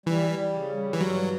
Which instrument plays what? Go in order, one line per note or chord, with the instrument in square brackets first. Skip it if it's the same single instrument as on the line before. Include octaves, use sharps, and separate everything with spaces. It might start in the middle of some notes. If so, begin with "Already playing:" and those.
[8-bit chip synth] E3 [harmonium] G3
[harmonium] G3
C#3
G3
[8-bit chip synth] E3
[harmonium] G2 [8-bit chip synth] F#3